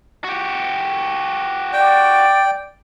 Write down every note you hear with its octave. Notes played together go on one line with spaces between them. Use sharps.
F#4 G4
D5 G5